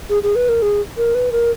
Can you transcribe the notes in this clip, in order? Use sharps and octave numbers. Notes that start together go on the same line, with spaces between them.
G#4
G#4
B4
A#4
G#4
A#4
B4
A#4